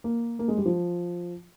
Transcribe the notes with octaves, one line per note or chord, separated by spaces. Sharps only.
A#3
A#3
G#3
G3
F3